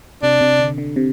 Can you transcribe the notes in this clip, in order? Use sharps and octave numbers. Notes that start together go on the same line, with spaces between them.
C3 D4
C3
D3
D3
C3